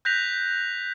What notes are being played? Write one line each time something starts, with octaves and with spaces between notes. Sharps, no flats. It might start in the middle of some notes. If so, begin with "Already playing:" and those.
F#6 G6 A#6 B6 F7